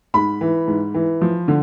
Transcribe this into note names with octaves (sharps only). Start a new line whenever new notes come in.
G#2 B5
E3
G#2
E3
F3
D3